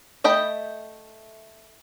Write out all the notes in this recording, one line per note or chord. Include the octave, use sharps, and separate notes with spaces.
A3 D#5 G5 B5